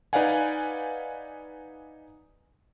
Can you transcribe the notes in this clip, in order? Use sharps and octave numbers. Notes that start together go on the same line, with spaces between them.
D#4 B4 D5 F5 F#5 G#5